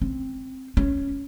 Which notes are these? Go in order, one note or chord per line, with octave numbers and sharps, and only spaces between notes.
C4
C#4